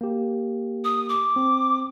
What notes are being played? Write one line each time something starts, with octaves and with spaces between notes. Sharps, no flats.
A#3 G4
D#6
D6
C4